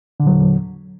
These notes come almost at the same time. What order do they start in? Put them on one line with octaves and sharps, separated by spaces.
D3 A#2 F#3 E2